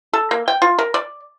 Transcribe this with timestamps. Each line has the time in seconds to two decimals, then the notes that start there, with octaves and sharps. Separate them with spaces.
0.13 A4
0.31 A#3
0.48 G5
0.62 F4
0.79 A#4
0.94 D5